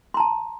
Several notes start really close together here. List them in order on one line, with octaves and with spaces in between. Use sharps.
C6 A#5 A5